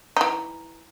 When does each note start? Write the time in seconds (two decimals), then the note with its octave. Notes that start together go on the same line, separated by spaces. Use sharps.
0.17 E3 D#4